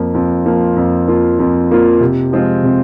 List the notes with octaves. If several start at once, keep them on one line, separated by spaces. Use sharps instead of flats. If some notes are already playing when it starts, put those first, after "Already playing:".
Already playing: F2 F3 A#3 F4
F2
F3 A#3 F4
F2
F3 A#3 F4
F2
F3 A#3 F4
C3
F3 G#3 C4 F4
C3